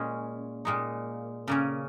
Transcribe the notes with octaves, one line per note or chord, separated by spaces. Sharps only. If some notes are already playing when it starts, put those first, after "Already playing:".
Already playing: A#2 G#3 C#4
A#2 G#3 D#4
C#3 A#3 C#4